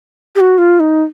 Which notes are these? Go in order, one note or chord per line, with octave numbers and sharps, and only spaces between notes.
G4
F#4
F4
D#4